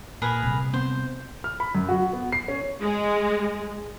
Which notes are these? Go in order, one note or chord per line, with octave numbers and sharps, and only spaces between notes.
A#2 G#4 A#4 B4
C3 G3
B3 C4 C5
F6
B5
F#2
F#4
B3
C7
C#4
G#3